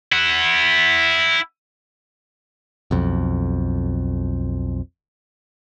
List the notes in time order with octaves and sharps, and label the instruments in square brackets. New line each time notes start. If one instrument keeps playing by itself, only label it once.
[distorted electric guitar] E4 F#5
[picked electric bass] B1 F2